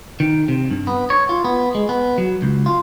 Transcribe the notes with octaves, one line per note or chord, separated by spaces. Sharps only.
D#3
C3
G2
B3
C#5
F4
B3
G#3
B3
F#3
C#2
F4